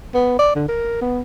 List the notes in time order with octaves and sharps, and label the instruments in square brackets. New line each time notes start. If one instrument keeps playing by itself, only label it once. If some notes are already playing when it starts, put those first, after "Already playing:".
[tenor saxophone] B3
D5
D3
A#4
B3